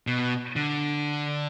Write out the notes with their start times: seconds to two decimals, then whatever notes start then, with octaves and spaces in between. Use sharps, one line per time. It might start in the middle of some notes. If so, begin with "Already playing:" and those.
0.07 B2
0.56 D3